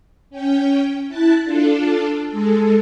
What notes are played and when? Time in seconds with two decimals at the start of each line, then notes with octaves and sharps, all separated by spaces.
0.30 C#4 G5
1.08 E4 A5 F#6 A6
1.44 D4 F4 A4
2.30 G#3 A4